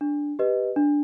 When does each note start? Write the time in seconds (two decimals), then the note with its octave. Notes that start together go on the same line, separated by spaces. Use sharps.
0.01 D4
0.39 G4 B4 D#5
0.76 D4